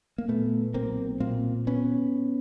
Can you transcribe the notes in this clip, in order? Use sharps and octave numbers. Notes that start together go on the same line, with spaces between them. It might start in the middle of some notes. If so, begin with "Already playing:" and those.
A#3
A#2 A3 B3
B1 A#3 C4
A#2 A#3 C4
B3 C#4